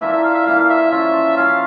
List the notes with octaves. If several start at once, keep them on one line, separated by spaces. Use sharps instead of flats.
E3 A#3 D4 F4 E5
E5
F5
E5
E3 A#3 D4 F4 F5
F5
E5
F3 C#4 F4 E5
F3 C#4 F4 F5